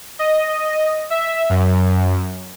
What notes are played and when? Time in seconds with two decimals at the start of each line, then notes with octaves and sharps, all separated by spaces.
0.19 D#5
1.10 E5
1.50 F#2